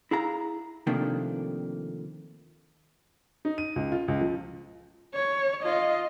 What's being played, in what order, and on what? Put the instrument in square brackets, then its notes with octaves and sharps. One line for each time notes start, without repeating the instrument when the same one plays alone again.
[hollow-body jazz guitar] E4 G#4 F5 A#5
C3 D#3 F3 A3 A#3 D4
[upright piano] D#4
D#7
C#2
F4
C#2
F3
[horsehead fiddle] C#5
F4 D#5